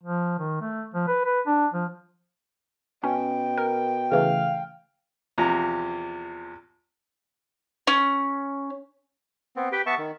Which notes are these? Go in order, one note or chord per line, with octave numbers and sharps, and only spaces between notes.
F3
D#3
A3
F3
B4
B4
D4
F3
B2 C#4 G5
A#4
C#3 E3 A3 F5
E2 C3 F3 A#5
C#4
B3 C4
G4 B4 G5
B3 E5 A5 C#6
D#3